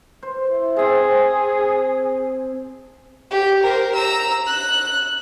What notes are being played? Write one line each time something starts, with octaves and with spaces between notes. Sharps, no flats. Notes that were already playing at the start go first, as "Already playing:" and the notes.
C5
E4
C4 G#4 A5
G4
A#4 C5
A#5 E6
F#6